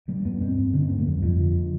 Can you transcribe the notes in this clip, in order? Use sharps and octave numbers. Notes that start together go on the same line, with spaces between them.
G2 G3
G2 B3
G2 C4
G2
D3 D4
C4
G2 B3
A3
F2 G3
F2 F3
D3